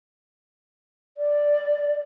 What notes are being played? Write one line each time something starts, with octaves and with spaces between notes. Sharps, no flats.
D5